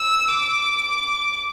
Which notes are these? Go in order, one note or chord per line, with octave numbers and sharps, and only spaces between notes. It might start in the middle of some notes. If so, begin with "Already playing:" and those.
Already playing: E6
D6